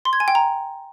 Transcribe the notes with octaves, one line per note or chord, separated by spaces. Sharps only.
C6
G#6
G#5
G5
A#5